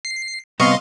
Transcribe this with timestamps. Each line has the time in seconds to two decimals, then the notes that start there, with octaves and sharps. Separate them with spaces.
0.05 C7
0.60 C3 G3 B3 D#5 F5 C6 C#6